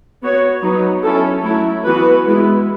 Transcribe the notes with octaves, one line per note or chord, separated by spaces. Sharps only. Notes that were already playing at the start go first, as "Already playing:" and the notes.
B3 F#4 C#5
F#3 B3 D#4
C#4 E4 A4
F#3 A3 E4
E3 B3 F#4 B4
G#3 B3 E4